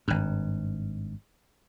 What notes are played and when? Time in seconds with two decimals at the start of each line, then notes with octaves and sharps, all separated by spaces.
0.08 G#1 G2